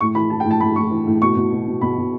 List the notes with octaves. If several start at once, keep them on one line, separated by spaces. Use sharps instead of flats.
A2 C#6
E3 B5
E3 A5
G5
A2
A5
A2 B5
A2 C#6
E3
A2
B2 C#6
B2
B2
B2
B2 B5
B2